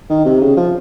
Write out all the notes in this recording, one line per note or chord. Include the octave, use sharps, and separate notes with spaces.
D#3
C3
C#3
F3